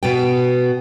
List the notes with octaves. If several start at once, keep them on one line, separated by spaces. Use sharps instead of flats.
B2 B3 G5